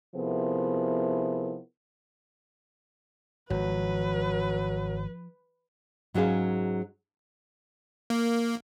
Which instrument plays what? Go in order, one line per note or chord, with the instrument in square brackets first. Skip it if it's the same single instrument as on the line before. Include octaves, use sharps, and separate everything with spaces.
[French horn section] C3 F3 B3 E4 G#4 A#4
[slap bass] G#1 [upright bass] F3 [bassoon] F#3 [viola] B4
[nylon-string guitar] G#2 F#3 C#4 G#4 F5
[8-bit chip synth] A#3